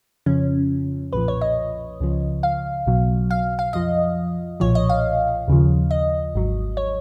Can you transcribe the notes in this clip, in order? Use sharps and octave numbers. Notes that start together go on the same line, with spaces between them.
F2 C#3 F3 C#4
B1 A#2 F3 B4
C#5
D#5
C#2 C#3 F3
F5
B1 B2 F#3
F5
F5
F2 F3 D#5
B1 A#2 F3 C#5
D#5
F5
D#2 C#3 F3
D#5
G#1 G#2 F#3
C#5